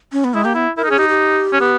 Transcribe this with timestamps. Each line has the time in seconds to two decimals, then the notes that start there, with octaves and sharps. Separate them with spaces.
0.13 C#4
0.24 B3
0.34 G#3 E4
0.44 A#3 G4
0.54 B3 E4
0.77 E4 A#4
0.84 D#4
0.88 C#4 G#4
0.98 D#4 G4
1.09 G4
1.53 C#4
1.61 B3